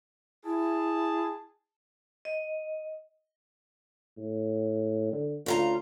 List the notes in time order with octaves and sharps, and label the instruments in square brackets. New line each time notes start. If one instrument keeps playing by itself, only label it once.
[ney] E4 [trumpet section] G#4 A5
[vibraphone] D#5
[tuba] A2
D3
[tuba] D2 [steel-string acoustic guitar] C#3 F4 A#5